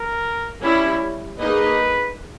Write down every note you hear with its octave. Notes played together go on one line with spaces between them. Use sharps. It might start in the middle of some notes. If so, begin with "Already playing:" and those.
Already playing: A#4
G3 C#4 E4
A#3 D#4 G#4 B4 D#5